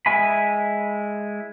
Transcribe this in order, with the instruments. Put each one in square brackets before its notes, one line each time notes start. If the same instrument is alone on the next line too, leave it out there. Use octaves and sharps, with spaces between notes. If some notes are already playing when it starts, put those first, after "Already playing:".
[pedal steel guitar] G#3 E4 E5 G#5 B5